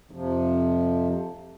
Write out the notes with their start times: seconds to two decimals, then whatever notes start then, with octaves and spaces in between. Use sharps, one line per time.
0.11 F2 C3 F3